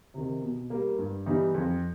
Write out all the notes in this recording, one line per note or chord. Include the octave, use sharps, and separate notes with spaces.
C3 D#3
B2
G3 A#3
G2
E3 G3 B3 D#4
F2